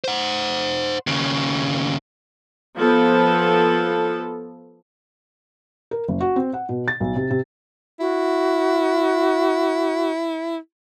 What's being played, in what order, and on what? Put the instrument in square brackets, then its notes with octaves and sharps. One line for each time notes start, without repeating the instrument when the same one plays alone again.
[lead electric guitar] C5 F#5
D#2 C#3
[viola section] F3 B3 A4
[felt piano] A#4
F#1
F#4
C4
F#5
B2
A6
B1
C3
C3
[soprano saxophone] E4 [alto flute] F#4